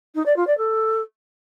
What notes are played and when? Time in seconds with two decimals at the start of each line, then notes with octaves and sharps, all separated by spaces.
0.15 D#4
0.26 D5
0.36 F4
0.47 D5
0.58 A4